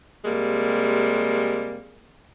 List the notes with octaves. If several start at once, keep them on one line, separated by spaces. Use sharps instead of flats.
C3 G3 G#3 A#3